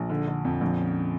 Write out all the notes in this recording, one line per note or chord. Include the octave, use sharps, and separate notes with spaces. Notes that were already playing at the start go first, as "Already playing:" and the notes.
Already playing: A#1
D3
D3
F2
A#1
C#4